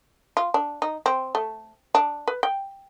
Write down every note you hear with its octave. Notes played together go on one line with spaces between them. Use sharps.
F4
D4
D#4
C4
A3
D4
B4
G5